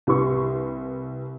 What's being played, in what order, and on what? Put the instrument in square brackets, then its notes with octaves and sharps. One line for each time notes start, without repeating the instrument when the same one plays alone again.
[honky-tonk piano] C2 G4 B4 C6 C#6